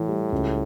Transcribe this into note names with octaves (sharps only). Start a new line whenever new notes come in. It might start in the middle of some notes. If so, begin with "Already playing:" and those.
Already playing: A2 E3
G3
C#2